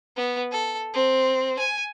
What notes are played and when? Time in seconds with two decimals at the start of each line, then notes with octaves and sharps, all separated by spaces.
0.17 B3
0.52 A4
0.94 C4
1.59 G#5